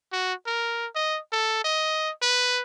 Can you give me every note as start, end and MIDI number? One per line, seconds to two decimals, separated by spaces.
0.12 0.34 66
0.46 0.87 70
0.95 1.19 75
1.32 1.59 69
1.64 2.11 75
2.22 2.62 71